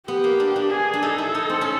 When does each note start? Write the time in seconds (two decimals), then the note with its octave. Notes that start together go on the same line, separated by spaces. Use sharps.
0.08 B3 G4
0.24 A#3
0.40 D4
0.56 D4
0.71 G#4
0.93 D4
1.02 D#4 A4
1.18 E4
1.35 D#4
1.50 C4
1.61 C#4